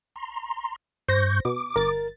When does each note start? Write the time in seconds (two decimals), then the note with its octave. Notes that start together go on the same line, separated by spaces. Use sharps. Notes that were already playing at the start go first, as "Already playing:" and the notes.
0.16 A#5 C6
1.08 G2 C5 C#6 G6 A#6
1.45 B2 D6
1.76 G1 A#4 A6